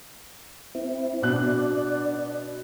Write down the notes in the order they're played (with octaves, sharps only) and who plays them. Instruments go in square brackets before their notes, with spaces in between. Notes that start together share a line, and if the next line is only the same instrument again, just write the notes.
[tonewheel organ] C4 E4
[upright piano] B2 F#6 [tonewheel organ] D4 D5